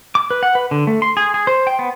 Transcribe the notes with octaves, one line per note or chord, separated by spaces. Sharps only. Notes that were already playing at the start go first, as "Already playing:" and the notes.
D6
B4
F#5
B4
D3
A3
C6
G#4
G#4
C5
G5
B3